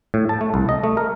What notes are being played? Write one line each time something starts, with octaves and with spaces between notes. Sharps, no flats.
A2
A5
A3
C2
D#5
A3
A#4